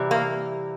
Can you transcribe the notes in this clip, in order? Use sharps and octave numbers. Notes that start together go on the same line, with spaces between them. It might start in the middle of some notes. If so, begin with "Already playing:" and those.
Already playing: C3 E3 G3
A#3